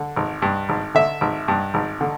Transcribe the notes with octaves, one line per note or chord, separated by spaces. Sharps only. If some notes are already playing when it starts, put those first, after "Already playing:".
Already playing: D3
G#1
G2
G#1
D3 E5
G#1
G2
G#1
D3